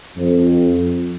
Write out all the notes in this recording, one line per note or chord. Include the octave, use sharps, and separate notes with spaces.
F2